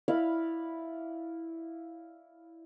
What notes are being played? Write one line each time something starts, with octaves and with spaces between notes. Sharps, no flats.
E4 D5 F5 B5